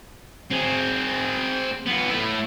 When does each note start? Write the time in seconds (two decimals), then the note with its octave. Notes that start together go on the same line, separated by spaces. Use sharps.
0.50 C4 G#4
1.86 B3 F4
2.09 A3 E4